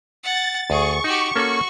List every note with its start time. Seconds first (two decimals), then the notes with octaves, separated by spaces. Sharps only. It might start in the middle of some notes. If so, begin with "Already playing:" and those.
0.23 F#5 A6
0.70 D2 G#4 C#6
1.04 D#4 F#4 G4
1.36 A#3 C#4 F#4 A4